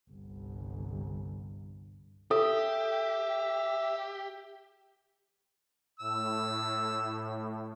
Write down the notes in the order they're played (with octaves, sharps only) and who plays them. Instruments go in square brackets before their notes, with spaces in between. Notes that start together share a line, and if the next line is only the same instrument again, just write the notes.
[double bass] G1 C2
[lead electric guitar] G4 [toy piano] A4 [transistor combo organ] E5
[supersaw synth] A2 [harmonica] E6